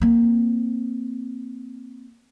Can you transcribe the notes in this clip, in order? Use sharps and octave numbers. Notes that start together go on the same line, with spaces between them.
A#3 C4